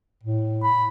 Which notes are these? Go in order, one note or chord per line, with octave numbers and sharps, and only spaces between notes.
A2
B5